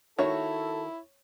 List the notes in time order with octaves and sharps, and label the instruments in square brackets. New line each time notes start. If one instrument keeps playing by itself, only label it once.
[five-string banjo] D#3 F#4 E5 [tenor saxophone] E4 [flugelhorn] A4 [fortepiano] C#5